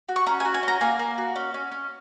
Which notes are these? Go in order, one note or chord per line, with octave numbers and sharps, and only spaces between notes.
F#4
C#6
C#4 A#5
G#5
F#4
G#5
C#4 A#5
A#3 G#5
A#3
F#4
C#4
C#4
C#4